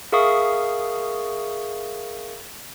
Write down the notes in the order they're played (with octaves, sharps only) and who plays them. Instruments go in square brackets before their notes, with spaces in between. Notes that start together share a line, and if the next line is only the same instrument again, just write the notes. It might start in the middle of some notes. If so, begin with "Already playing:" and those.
[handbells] G#4 A#4 E5 F5 C#6 D#6